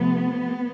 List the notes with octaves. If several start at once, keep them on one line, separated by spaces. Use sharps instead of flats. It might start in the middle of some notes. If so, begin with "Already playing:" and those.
Already playing: C3 F3 A3 B3